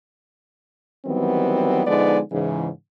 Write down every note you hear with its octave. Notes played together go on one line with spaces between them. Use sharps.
D#3 E3 F#3 G3 B3 C4
D3 F3 G#3 B3 D#4 D5
G#2 C#3 E3